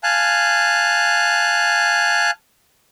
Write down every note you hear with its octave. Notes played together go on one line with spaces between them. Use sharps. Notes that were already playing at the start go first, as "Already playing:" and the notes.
F5 G#5 A5 F#6